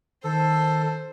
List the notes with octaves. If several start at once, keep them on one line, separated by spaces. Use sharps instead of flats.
D#3 A4 C5